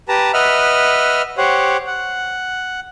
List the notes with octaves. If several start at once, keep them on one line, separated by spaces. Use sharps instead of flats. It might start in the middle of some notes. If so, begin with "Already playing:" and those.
G4 B4 A5 A#5
B4 D#5 E5 F#5 F6
G4 C5 C#5 F#5
F#5